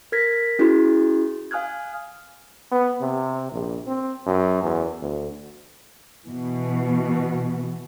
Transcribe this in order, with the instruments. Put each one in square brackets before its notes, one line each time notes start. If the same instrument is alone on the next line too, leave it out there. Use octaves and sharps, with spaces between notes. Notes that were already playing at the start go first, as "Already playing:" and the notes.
[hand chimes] A#4 F6 G#6 A#6 B6
C#4 E4 F#4 G#4 C6
F5 G#5 D#6 F6 F#6 G#6
[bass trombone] B3
C3
A#1
C4
F#2
E2
D2
[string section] B2 E3